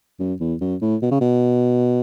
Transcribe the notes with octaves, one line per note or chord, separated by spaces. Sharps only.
F#2
E2
F#2
A2
B2
C#3
B2